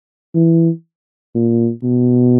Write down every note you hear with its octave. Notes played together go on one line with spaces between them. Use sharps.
E3
A#2
B2